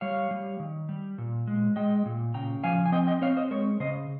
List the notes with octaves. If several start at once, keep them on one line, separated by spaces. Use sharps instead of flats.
G3 C#5 F5
G3
D#3
G3
A#2
G#3
G#3 D#5 G5
A#2
C#3 G5 A#5
F3 F5 G#5
G#5
C4 D#5 G5
D#5 G5
C4 C#5 F5
C5 D#5
G#3 A#4 C#5
C#3 C5 D#5